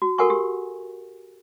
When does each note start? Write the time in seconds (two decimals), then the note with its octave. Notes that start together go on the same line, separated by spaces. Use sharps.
0.02 F#4
0.18 F#4 A4 A#4 F#5 G#5 C#6
0.30 G4